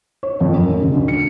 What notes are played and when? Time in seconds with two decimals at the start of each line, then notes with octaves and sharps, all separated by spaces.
0.23 C#5
0.41 F2
0.54 F#2
0.68 A1
0.82 C#3
0.94 D2
1.08 C#7